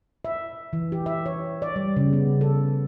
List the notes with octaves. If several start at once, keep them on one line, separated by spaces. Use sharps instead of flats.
E5
E3
G4
E5
C#5
D5
G3
C#3
B3
A4